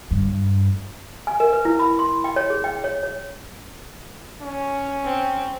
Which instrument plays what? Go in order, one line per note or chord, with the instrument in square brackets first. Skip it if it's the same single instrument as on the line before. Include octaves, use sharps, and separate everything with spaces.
[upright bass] G2
[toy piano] G#5
A#4
B4
E4
B5
C6
G5
C#5
G#4
G5
C#5
C#5
[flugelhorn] C#4
[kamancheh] C4